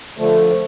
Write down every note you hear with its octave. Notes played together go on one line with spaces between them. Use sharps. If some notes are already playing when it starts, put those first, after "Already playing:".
D3 F3 A3